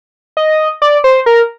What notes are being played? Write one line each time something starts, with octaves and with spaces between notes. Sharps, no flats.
D#5
D5
C5
A#4